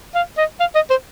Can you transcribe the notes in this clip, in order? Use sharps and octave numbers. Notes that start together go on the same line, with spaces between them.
F5
D#5
F5
D#5
C5